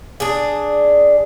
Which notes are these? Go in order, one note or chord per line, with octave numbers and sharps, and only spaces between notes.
D4 G#4